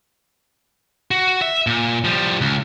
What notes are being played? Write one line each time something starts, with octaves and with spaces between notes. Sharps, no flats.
F#4
E5
A#2
F3 G3
C#2